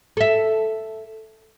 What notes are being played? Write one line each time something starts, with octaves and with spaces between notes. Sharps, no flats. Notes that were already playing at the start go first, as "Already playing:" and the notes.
A4 E5